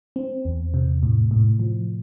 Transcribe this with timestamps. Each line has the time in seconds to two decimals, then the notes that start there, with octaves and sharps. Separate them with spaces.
0.16 C4
0.45 E2
0.74 C3
1.03 A2
1.31 A2
1.60 F3